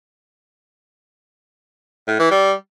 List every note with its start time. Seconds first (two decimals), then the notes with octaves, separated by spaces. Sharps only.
2.08 A2
2.19 E3
2.31 G3